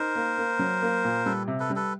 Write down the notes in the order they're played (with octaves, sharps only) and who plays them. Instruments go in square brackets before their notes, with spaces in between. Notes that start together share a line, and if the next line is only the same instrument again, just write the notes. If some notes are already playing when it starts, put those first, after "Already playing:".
Already playing: [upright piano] D#4 [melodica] A#4 C5
[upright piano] A#3
A#3
F#3
A#3
A#2
[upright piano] G3 [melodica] A4 B4
[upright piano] C3
[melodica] A4 B4
[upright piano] G3
[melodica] A4 B4